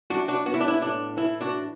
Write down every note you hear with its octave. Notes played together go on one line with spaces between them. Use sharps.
F#2 D4 F#4
D4 F#4
B3 F#4
E4
D4
E4
A2 D4
E3 E4
D4 F#4